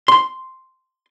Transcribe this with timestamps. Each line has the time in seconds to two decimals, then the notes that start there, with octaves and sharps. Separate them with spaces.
0.08 C6